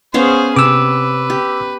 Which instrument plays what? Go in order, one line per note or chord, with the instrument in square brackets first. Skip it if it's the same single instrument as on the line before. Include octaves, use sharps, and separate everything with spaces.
[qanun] B3 C#4 F5 [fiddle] G#4 C5
[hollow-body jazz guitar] C3 [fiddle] B4 [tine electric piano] D6 E6
[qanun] G4